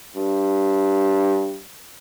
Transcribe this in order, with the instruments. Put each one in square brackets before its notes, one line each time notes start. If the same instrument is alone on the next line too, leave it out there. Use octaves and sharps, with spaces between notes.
[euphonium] G2